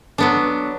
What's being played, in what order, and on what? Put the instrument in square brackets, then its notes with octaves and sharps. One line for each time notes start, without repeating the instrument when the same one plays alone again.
[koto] F#3 B3 D4